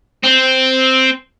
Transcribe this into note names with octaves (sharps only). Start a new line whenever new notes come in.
C4